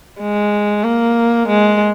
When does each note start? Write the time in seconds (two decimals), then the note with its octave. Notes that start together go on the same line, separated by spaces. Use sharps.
0.21 G#3
0.84 A#3
1.48 G#3